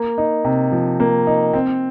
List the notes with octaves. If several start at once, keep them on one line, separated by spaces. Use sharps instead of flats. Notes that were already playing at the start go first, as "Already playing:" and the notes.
Already playing: A#3
D#4
C3
F3
A#3
D#4
C4